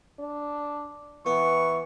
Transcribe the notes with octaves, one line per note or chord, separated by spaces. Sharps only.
D4
E3 B3 C#6